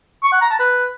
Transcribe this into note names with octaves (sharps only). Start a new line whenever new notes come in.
C#6
F#5
A#5
A5
B4